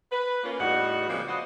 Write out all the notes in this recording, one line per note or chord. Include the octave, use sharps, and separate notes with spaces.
B4
A#3 C#4 F4
E2 A2 G3 D#4 F#4 F#5
C#3 F3 G3 G#3 A#3 C4
D4 F#4 B4 C5 D#5